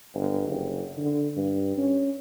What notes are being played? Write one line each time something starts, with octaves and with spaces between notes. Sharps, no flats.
G1
F#1
D3
G2
C#4